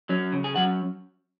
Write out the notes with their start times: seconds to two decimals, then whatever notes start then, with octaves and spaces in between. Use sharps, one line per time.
0.09 F#3 C#4
0.32 C#3
0.44 G#4
0.56 F#3 C#4 F#5